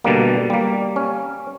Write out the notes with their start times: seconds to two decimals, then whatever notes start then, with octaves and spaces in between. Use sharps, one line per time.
0.04 B2 D3 G3 A#3
0.50 G3 A#3
0.96 C#4